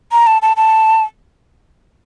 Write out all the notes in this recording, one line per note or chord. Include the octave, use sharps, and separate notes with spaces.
A#5
A5
A5
A5